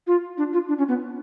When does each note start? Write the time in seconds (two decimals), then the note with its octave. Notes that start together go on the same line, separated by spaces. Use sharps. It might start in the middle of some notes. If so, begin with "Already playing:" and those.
0.07 F4
0.38 D4
0.53 F4
0.68 D4
0.78 C#4
0.88 B3